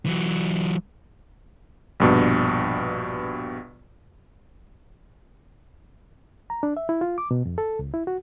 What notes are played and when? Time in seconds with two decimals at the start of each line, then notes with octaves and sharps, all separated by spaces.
0.06 E3 F#3
2.00 A#1 G2 B2
6.50 A#5
6.63 D4
6.77 E5
6.89 E4
7.01 F4
7.18 D6
7.31 B2
7.46 F2
7.58 A4
7.79 C#2
7.94 E4
8.07 F#4